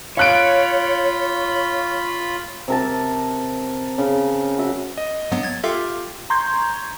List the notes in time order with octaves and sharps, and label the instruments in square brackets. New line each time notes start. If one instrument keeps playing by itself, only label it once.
[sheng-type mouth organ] F4 B5 [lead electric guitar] C#5 [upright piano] F5 F#6 D7
[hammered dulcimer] C3 A#4 A5
C#3
F#4 E5
[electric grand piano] D#5
[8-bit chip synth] G2 F#3 B3
G#6 A6
[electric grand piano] F4 G4 [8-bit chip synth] A4 E5 F5
[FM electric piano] A#5 C6 C#6 G6 G#6